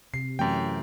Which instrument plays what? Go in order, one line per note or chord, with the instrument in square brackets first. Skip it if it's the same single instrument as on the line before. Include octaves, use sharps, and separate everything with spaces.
[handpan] C3 [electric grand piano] C7
[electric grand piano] F#2 G5 [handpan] E3 A3 C#4